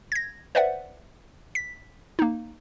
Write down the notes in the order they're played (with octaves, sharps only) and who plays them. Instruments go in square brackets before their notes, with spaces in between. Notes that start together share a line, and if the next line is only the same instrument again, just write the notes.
[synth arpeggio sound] G#6 A#6
B4 C5 D5 E5 F#5
B6
A#3 D#4